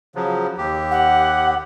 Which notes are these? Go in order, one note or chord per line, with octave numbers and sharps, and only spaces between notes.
C#3 F3 F#3
D#2 G4
F#5